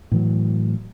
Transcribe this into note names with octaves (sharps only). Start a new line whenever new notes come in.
A2 E3 F#3